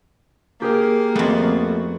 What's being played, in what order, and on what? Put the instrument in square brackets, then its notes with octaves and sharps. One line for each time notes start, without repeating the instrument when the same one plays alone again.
[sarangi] A#3 [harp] G4 G#4 A#4
[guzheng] F2 B3 [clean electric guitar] A3 F#4